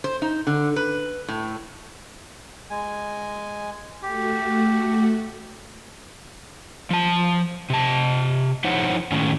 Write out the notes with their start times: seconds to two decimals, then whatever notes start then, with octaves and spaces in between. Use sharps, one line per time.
0.04 C5
0.22 D#4
0.47 D3
0.76 B4
1.28 A2
2.71 G#3 G#5
4.03 A3 F#4 G4
6.91 F3 A5
7.70 C3 A5
8.64 F3 D#4 E4 C5 C#5 F#5
9.12 A2 D#3 C#4